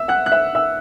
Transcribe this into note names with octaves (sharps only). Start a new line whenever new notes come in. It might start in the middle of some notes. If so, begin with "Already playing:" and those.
Already playing: E5 E6
F#5 F#6
F#6
E5 E6
E5 E6